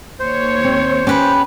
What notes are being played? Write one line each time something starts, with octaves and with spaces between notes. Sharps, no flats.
D#2 C5 C#5
C4
C#4 G4 B4 B5